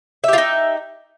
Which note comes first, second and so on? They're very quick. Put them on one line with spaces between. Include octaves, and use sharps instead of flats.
E5 G4 F4 D#4